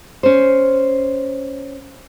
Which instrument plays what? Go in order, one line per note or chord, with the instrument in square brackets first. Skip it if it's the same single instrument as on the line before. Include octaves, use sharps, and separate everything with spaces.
[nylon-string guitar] C#4 C5